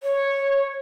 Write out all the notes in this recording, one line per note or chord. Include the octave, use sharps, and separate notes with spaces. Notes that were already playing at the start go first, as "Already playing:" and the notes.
C#5